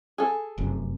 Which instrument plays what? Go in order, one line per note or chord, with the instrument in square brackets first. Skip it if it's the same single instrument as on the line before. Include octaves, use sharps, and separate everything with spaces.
[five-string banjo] G#4 A4
[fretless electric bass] F1 F#2 C3